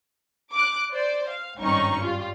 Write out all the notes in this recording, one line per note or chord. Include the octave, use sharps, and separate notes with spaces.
D6 F#6
C5 D5
F5
G#1 G2 C4 C#4 D#4 C#6
G3 F4